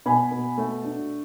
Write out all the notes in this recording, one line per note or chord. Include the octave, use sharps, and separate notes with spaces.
B2 G#5 B5
B2
A3
D4